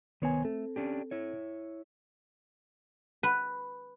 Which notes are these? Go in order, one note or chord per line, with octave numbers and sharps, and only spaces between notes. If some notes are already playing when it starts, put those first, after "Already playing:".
C2 D#3 B3 C5 C#5 G#5
A3 C4 A4
C#4 D4 G4
E4 C#5
B4